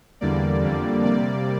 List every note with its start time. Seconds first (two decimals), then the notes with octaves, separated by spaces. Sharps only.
0.21 E2 D3 G3 A#3 D5
0.62 F2 D3 G3 A#3
1.03 C3 G3 A#3 D5